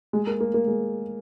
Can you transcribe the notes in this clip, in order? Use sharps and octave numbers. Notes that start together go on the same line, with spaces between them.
G#3
A#3
A#3
A#3
G#3